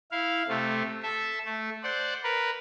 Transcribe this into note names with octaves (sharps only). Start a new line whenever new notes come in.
E4 F5
C3 A3
A4 E5
A3
C5 D5 F#5
A#4 B4